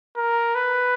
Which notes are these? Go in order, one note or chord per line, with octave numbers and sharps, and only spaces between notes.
A#4
B4